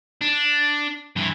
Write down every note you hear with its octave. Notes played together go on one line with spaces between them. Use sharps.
D4
G2 E3